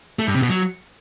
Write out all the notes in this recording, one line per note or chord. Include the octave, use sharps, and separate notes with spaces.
A3
G2
C3
B2
F#3